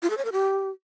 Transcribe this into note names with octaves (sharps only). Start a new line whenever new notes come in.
F4
A4
C#5
A#4
G4